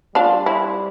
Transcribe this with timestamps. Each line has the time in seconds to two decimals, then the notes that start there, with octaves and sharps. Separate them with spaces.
0.15 G3 D4 F4
0.46 C4 E4